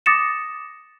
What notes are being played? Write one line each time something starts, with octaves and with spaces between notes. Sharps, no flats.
D6 D#6 A6 A#6 C#7 E7